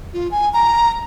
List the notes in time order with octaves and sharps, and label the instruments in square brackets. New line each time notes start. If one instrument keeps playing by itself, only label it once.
[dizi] F4
G#5
A#5